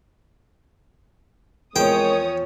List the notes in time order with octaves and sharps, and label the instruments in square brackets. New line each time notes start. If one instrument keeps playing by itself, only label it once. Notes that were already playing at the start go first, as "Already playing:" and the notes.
[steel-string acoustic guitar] E2 F3 [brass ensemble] G#3 C4 A#4 [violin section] C#5 D#6 [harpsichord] G5